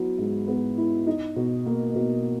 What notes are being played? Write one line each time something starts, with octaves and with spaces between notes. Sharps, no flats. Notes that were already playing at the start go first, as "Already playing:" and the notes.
Already playing: F#3 B3 E4
G#2
B3
E4
D#4
B2
A#3
B2